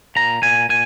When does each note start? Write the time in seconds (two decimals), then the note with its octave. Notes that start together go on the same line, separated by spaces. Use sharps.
0.16 A#2 A#5
0.42 A#2 G#5
0.69 A#2 G#5